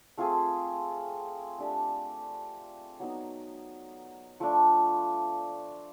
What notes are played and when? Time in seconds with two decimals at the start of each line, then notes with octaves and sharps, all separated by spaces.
0.18 A3 C4 F4 G#4
1.59 A3 D4 G4
3.00 F#3 B3 D#4
4.40 F3 A3 D4